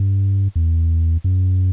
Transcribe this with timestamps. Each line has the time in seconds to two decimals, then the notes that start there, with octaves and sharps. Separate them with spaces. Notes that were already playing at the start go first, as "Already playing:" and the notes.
Already playing: G2
0.56 E2
1.24 F#2